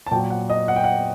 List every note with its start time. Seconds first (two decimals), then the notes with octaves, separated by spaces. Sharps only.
0.07 A5
0.11 A#2 F#3 G5
0.30 F#5
0.50 D#5
0.68 F#5
0.76 G5
0.84 F#5